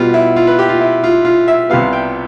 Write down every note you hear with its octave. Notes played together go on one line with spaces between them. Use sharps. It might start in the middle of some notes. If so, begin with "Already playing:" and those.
Already playing: B2 G3 B3 F4
E4
F4
B4
G4
F4
E4
F4
F4
E5
C2 C3 G3 B3 F5
G5